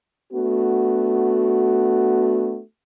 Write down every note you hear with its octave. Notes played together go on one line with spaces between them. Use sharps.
A3 B3 D4 F#4